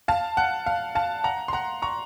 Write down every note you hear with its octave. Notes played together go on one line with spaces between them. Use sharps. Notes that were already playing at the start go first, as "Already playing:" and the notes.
F5 A5
F#5
F5
F5 A5
F#5 A#5
C6
F#5 A#5
A#5 C#6